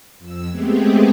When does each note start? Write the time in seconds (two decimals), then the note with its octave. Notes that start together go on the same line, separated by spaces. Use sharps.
0.19 F2 E6
0.50 G#3 A3 B3 C4 G4 G#4